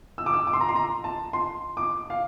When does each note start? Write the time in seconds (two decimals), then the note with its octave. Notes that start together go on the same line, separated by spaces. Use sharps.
0.18 E6
0.26 D6
0.33 E6
0.47 D6
0.53 C6
0.61 A#5
0.69 C6
0.75 A#5
1.04 A5
1.33 C6
1.77 D6
2.10 F5